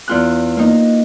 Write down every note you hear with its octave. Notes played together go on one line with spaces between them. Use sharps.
E2 F4 F#6
A#3 D#4